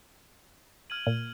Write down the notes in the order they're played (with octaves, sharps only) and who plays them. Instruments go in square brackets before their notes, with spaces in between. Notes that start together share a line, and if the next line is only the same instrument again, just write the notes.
[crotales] F6 G#6 D#7 F#7
[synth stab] A#2